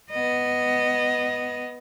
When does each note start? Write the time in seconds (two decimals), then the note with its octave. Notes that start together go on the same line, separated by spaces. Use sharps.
0.11 B3 D#5